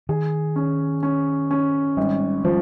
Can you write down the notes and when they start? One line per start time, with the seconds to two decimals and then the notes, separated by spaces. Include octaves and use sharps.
0.09 D#3 G#4
0.56 C#4
1.03 C#4
1.51 C#4
1.97 G#1 G3
2.44 F3 G3